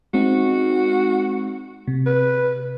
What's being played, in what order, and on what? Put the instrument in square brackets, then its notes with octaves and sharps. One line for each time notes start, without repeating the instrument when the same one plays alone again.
[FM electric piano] G#3 C4 D#4 [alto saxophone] F#4
[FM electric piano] C3
[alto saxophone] B4